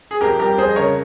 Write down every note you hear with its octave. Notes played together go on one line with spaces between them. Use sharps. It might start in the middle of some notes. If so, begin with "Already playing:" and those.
G#4
F2 G4 A#4
G3 G4 A#4
F2 G#4 C5
D#5
C#3 A#4 C#5